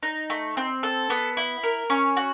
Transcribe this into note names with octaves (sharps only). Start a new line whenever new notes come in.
D#4
A3
C4
A4
B3
E4
A#4
C#4
F#4